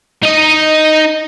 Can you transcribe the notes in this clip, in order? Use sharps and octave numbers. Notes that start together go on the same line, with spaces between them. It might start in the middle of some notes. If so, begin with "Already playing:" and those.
D#4 D#5